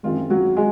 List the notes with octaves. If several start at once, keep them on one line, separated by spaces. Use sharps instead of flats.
F#2 D#3 G#3 C4 F4
F#3 F#4
G#3